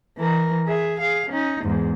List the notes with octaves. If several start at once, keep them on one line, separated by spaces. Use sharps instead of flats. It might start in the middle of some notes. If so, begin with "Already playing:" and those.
E3 A#4
G#4 E5
G#4 F5
C#4 D#4
E2 G#2